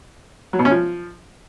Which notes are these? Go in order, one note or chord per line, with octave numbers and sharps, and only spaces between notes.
F#3
B2
C#4
F3